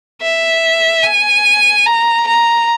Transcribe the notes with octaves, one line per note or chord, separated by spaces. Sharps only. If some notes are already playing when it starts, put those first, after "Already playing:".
E5
G#5
A#5
A#5